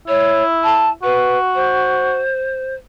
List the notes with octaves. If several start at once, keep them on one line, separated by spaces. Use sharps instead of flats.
E4 C#5
A5
F#4 B4
C5